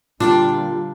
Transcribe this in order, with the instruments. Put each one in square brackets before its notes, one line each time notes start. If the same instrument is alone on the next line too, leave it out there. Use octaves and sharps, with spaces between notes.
[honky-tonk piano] A#2 [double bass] D3 G3 [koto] D4 [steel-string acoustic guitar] F4 F5 G5